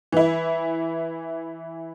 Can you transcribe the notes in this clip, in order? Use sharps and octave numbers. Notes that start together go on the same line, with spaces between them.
E3 E4